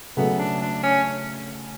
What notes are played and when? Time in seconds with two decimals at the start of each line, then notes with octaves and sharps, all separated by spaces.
0.17 C#3 F#3 A3 B3
0.39 D4
0.62 D4
0.83 C#4